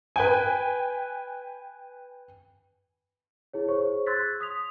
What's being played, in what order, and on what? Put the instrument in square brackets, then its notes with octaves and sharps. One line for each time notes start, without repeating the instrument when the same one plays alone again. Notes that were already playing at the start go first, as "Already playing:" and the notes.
[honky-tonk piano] B4 G5 G#5
[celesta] E4 G#4 C#5
G#4 C5 C#5 C#6
C6 E6 F#6 G#6 A6 B6
D#6 B6 F7